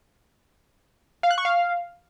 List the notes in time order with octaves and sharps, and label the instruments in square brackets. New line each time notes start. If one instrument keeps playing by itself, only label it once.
[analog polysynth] F5
F#6
C#6
F5